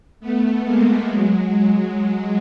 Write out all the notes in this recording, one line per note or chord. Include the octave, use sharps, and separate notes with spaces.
A3 B3
G#3 A#3
F#3 G#3
F#3 G#3